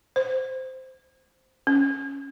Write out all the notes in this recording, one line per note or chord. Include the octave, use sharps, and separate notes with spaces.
C5
C#4